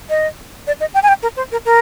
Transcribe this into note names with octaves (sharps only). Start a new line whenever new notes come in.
D#5
D5
D#5
G5
G#5
G5
A#4
C5
A#4
A#4